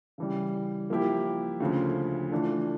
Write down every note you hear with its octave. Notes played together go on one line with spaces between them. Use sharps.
C#3 E3 G3
F3 A#3 E4 G4
D2 C#3 F3
E3 A3 D4 F4 A4